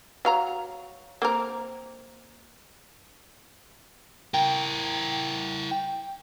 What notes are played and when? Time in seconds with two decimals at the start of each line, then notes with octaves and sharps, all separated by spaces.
0.25 F#3 F5 A#5
1.22 A#3 C4 A#4
4.34 E4 A#4 G5
5.71 G5